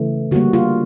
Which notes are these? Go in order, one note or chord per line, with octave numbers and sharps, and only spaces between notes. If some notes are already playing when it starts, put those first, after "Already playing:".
Already playing: C#3 E3 A3
D3 G3 A#3 F#4
F4